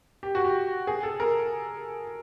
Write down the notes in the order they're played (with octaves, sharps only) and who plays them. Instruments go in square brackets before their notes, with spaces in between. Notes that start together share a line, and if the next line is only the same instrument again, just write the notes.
[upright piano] G4
F#4
G4
G#4
A4
A#4